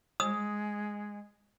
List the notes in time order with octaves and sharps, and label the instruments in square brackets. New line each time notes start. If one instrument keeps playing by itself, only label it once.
[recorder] G#3 [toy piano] D#6